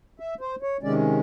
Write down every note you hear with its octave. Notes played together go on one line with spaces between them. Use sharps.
E5
C5
C#5
C3 D#3 G#3 C#4 D5